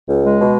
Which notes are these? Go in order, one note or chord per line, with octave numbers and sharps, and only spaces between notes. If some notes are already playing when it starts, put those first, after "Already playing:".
C#2
G#3
B2